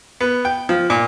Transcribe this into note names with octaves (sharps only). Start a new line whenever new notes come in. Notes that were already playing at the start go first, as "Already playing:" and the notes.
B3
G5
F3
A#2